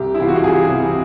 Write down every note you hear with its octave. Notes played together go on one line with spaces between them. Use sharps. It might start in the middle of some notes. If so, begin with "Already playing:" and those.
Already playing: C2 G4
E4
C3 E3 F4
F#4
G4
C2 G#4
C3 E3